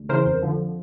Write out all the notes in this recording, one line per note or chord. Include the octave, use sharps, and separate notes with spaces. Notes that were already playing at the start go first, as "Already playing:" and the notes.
Already playing: D2
C#3 E3 A#4 C5
F2
D3 F3